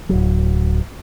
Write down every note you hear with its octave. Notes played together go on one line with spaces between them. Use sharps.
D1 A#1 F#3